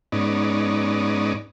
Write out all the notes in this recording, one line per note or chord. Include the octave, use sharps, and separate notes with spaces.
G#2 B3 C#4 D#4 D5